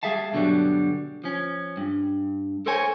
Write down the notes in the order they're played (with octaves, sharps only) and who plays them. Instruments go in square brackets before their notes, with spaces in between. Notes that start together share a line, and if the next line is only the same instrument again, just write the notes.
[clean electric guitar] G3 G#4 E5 F5 A5
G2 B2 D3 F#3 G3
F3 C#4
G2
A4 A#4 C5 C#5 G#5